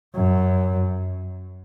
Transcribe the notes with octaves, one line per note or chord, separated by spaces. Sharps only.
F#2